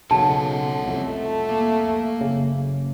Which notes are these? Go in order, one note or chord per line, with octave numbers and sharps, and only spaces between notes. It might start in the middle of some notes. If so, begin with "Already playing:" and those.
B1 C#3 A4 C#5 F#5 A5
C2 F2 A3
A#3
F#1 C#3